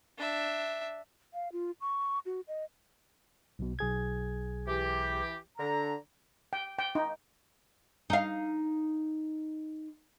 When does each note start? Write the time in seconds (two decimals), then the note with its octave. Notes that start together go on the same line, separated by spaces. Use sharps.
0.18 D4 E5
1.34 F5
1.52 F4
1.81 C#6
2.26 F#4
2.48 D#5
3.59 B1 B2
3.79 B1 G#4 G#6
4.67 E3 G4
5.58 D3 A#5
6.53 G5
6.79 G5
6.95 D#4
8.10 D#4 F5